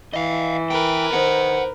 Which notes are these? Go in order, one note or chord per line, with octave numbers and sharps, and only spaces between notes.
E3 D#5 F5
A#4 B4 G5
D#3 C5 F#5